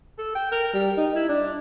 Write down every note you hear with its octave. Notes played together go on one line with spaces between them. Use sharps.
A4
G5
A#4
G3
D#4
E4
D4